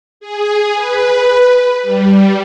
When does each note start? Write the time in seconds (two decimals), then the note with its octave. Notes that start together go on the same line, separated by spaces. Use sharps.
0.20 G#4
0.74 B4
1.83 G3